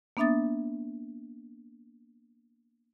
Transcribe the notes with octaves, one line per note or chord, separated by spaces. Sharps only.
A#3 B3 D4 E5 D#6 A6